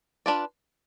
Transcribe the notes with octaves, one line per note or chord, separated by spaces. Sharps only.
D4 F4 B4 D5